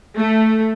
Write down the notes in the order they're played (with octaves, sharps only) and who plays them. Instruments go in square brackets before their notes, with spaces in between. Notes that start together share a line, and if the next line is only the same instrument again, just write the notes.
[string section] A3